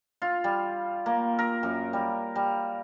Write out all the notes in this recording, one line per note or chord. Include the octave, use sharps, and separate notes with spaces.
F4
G3
A#3
A#4
F#2
G3
G3